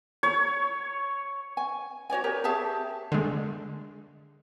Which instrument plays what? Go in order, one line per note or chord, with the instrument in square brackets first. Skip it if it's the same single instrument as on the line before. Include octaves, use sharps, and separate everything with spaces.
[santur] C#5
[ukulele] G#5
F#4 C#5 D5 G#5
G4 A#4 C#5
G4 G#4 E5 A5
[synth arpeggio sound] D3 G#3